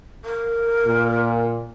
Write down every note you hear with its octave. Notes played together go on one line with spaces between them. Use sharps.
A#4
A#2